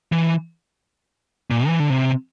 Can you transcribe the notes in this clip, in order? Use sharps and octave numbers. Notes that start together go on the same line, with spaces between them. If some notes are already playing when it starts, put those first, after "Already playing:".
E3
A#2
E3
D3
C3